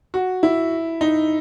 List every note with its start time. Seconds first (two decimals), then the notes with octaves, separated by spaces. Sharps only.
0.14 F#4
0.43 E4
1.01 D#4